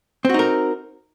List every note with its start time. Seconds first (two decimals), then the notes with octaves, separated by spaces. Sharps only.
0.25 C4
0.29 F#4
0.34 D#4
0.39 A#4